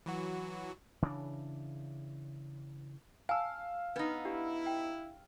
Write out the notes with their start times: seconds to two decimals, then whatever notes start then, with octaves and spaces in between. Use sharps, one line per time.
0.06 E3 F#3 F#4
1.02 C#3 E3 C4 D4
3.29 F5 G#5 A5 E6
3.96 B3 D4 D#4 B4
4.25 D4 E4 G4
4.66 G5